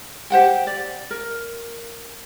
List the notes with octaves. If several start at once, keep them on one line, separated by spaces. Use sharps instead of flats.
G4 C5 F#5 G5
D5
A#4